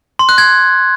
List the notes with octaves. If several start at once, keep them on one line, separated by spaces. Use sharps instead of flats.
C6
F#6
G#6